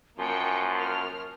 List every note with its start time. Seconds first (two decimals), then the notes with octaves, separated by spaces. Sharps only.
0.19 F#2 F3 A#3 G5 G#5 C#7
0.79 A#4 F6